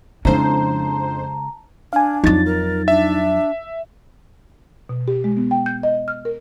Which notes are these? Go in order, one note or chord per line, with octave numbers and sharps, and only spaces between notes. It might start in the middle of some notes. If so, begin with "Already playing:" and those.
F2 C#3 G#3 D4 E4 C5 A5 A#5
D4 F5 G#5
F2 F#3 D#4 A6
A#4
D4 E5
B2
G4
G#3
B3
G5
G6
D#5
F6
A#4